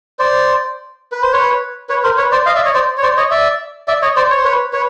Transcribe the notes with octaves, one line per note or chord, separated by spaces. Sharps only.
C5 D5
B4
C5
B4 C#5
B4 C#5
A#4 C5
B4 C#5
C5 D5
D#5 F5
D5 E5
C#5 D#5
C5 D5
C#5
C5 D5
C#5 D#5
D5 E5
D5 E5
C#5 D#5
C5 D5
C#5
C5
B4 C#5
B4 C#5